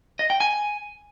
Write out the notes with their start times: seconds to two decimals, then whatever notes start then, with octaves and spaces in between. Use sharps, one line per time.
0.19 D#5
0.30 G5
0.40 G#5